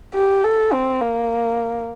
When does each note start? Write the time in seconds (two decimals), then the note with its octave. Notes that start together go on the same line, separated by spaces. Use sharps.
0.14 G4
0.44 A4
0.72 C4
1.01 A#3